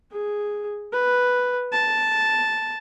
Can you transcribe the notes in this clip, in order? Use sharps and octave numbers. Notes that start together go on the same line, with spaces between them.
G#4
B4
A5